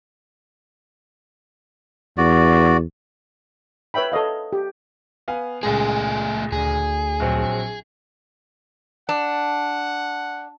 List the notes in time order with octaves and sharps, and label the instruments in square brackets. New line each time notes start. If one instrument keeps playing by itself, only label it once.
[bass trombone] E2 [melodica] F#4 D5
[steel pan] B4 C#5 E5 G5 B5
A4 C#5 D#5 F5
G4
[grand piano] B3 F5 G#5
[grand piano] C#2 A#2 G#3 [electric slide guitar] A3 G#4
[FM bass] D2 [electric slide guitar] G#4
[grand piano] A#1 F#3 C4
[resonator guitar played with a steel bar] D4 [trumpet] F#5